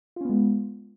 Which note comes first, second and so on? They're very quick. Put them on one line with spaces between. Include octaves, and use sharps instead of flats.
F4 C#4 B3 G#3